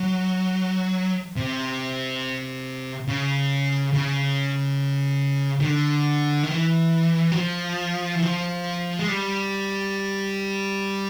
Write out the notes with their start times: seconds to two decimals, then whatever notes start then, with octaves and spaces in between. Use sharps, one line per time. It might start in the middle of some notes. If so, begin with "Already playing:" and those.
Already playing: F#3
1.36 C3
3.08 C#3
3.94 C#3
5.60 D#3
5.65 D3
6.43 D#3
6.51 E3
7.32 F#3
7.36 F3
8.15 E3
8.22 F3
8.99 G#3
9.08 G3